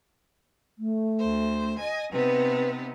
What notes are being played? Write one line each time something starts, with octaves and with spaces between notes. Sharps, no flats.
A3
D2 C5
D#5 G#5
C3 B3 D#4 B4